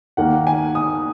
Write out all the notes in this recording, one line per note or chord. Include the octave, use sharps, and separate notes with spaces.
D#2 D#3 A#3 F#5
G#5
D#6